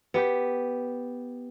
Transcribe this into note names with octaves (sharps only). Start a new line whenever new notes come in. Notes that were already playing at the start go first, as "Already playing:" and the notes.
B3 G4